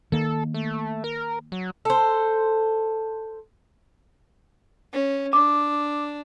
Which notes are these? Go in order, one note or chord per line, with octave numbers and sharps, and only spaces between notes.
D#3 A#3 A4
A3
A#4
F#3
A4 C5
C#4
D4 D6